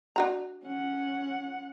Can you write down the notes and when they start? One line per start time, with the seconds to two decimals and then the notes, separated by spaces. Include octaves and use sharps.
0.16 D4 F#4 A#5
0.64 C#4 F#5